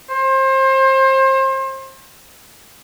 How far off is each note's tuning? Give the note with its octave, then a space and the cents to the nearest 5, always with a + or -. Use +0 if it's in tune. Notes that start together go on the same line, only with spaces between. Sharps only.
C5 +30